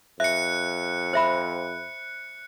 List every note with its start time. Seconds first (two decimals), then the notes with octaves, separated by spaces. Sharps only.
0.20 F2 E5 F#6 C#7
1.13 C5 E5 B5